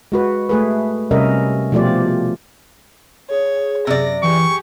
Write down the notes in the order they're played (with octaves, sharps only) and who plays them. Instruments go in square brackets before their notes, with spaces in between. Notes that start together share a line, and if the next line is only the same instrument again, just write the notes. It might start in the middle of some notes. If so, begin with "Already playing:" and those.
[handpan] G#3 F#4 B4
A3 G#4 B4
C3 G3 C#4 A#4 D#5 E5
B2 F3 A3 F4 G4 D5
[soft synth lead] G#4 [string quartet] C#5
[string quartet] F#2 A#6 [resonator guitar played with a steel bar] C3 D5
[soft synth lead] E3 [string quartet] G4 G#4 [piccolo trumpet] C#6